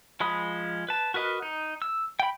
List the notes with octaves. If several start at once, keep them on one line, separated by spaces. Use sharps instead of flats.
F3 G#3 B5 D#6
B4 A5
F#4 A#4 B4 D#5
D#4
E6
G5 B5